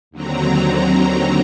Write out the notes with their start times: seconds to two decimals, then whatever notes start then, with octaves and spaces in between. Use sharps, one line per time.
0.11 D#2 D3 F#3 C4 A#5